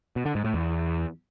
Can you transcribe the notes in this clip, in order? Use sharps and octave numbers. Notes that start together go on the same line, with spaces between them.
B2
D3
G#2
A2
E2